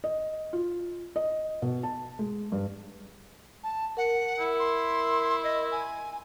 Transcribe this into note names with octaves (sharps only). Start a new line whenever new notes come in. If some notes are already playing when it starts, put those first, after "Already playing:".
D#5
F4
D#5
B2
A5
G#3
G2
A5
A#4 F#5
E4
C6
D#5
G#5